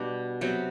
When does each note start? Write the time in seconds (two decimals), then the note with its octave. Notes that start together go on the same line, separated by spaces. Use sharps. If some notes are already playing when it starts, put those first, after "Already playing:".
Already playing: B2 G3 D4
0.41 C3 F#3 B3